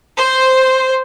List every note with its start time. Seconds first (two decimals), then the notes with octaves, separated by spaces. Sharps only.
0.16 C5